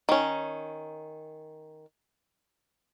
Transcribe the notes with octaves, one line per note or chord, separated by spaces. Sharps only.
D#3 C#4